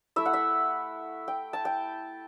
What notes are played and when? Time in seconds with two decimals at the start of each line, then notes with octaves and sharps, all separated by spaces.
0.16 A3 E4 E5
0.25 F#5
0.33 E5
1.28 G5
1.53 A5
1.65 G5